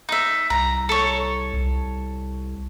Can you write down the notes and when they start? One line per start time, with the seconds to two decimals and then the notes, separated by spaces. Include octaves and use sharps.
0.09 D#4 E5
0.50 C2 A#5
0.89 A4 C#5
1.53 C2